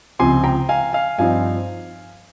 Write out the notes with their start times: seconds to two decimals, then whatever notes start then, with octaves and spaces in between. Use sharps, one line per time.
0.19 C#2 C3 F3 C4 G#5 C6
0.44 G5 A#5
0.69 F5 G#5
0.93 F5 G#5
1.18 G2 F3 C4 D#4 F5 G#5